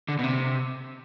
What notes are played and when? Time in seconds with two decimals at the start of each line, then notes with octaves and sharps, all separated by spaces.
0.09 D3
0.19 B2
0.24 C3